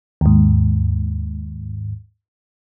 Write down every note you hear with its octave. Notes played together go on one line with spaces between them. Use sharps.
D#2 G#2